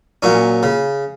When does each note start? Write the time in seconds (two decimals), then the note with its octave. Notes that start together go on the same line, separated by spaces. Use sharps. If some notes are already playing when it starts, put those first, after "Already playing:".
0.23 A#2 F#3 C#4
0.63 C#3